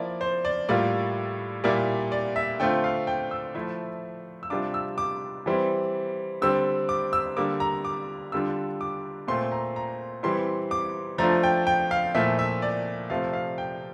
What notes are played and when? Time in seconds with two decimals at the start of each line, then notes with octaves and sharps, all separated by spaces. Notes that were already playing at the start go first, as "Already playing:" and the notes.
Already playing: F3 A#3 E4 D5
0.21 C5
0.45 D5
0.69 A2 G3 A#3 F4 D5
1.64 A#2 G3 A#3 E4 D5
2.12 D5
2.36 E5
2.59 D3 A3 C4 F4 G5
2.84 F5
3.07 G5
3.31 E6
3.55 F3 A3 E4
4.43 E6
4.50 C3 G3 D4 F4 D6
4.74 E6
4.98 D6
5.46 E3 G3 C4 E4
6.41 D3 G3 C4 E6
6.89 D6
7.13 E6
7.37 D3 G3 A#3 D6
7.60 A#5
7.85 D6
8.32 D3 G3 D4 F4 E6
8.81 D6
9.27 A#2 A3 C4 F4 C6
9.52 A#5
9.76 A#5
10.23 E3 G3 C4 E4 C6
10.71 D6
11.18 F3 A3 D4 F4 A#5
11.43 G5
11.67 G5
11.91 F5
12.15 A#2 F3 A3 E4 E5
12.39 E5
12.62 D5
13.10 C3 F3 A3 F5
13.33 F5
13.58 G5